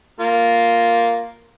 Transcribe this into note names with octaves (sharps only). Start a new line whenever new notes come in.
A#3 F4